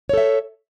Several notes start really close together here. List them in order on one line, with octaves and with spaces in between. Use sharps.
C#5 A4 E5